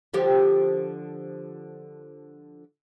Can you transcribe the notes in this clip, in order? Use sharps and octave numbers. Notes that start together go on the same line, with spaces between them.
D3 F3 G4